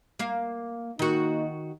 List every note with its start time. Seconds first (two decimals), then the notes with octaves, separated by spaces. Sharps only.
0.19 A#3 F5
0.99 D#3 A#3 D#4 F#4